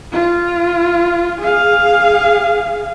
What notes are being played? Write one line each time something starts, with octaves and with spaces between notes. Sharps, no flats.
F4
G#4 F5